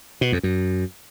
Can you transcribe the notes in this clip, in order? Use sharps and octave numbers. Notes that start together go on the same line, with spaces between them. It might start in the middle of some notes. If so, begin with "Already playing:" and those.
B2
F2
F#2